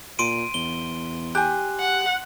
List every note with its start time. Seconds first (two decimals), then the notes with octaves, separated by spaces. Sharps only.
0.19 A#2 C6 D7 D#7
0.54 E2 G7
1.35 G4 G#4 F#6
1.80 F#5